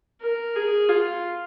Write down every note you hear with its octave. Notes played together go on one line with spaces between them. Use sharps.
A#4
G#4
F4